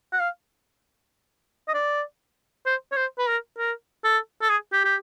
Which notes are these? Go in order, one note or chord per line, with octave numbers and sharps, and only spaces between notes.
F#5
F5
D#5
D5
C5
C#5
C5
B4
A#4
A#4
A4
A4
G#4
G4
G4